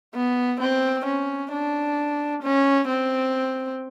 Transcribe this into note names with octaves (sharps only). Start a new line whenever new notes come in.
B3
C4
C#4
D4
C#4
C4